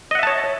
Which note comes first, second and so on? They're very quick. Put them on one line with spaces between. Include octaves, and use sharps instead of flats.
D#5 F#5 E5 A5 C#5